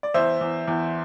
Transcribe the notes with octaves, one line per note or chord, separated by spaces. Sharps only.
D5
E2 C5 E5
E2
E2